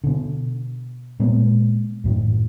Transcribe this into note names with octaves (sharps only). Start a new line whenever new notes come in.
B2 D3
A#2 G#3 B3
F#2 A2 D#3